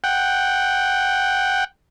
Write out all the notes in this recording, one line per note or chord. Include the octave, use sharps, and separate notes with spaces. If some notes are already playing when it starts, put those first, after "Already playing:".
F#5 G5